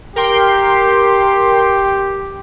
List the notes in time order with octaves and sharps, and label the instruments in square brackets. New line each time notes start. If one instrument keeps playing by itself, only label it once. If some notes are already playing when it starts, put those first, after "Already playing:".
[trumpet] G4 [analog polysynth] A#4 G5 C6